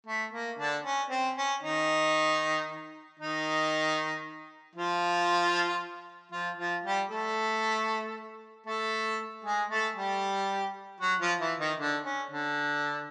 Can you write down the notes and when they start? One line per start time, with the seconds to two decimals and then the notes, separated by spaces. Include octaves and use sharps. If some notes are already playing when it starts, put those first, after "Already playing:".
0.07 A3
0.33 A#3
0.58 D3 D4
0.85 C#4
1.11 C4
1.37 C#4
1.63 D#3 D#4
3.20 D#3 D#4
4.76 F3 F4
6.32 F3 F4
6.58 F3 F4
6.84 G3 G4
7.10 A3 A4
8.66 A3 A4
9.45 G#3 G#4
9.70 A3 A4
9.96 G3 G4
11.01 F#3 F#4
11.20 F3 F4
11.40 E3 E4
11.59 D#3 D#4
11.79 D3 D4
12.05 C#4
12.31 D3 D4